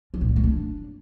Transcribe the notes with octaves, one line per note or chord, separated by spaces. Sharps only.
F3
A#2
G#3
A3
D4